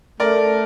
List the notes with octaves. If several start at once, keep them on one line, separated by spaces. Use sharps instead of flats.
A3 A#4 D5